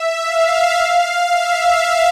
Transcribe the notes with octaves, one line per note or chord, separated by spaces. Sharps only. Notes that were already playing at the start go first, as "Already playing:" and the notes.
Already playing: E5
F5
F5
E5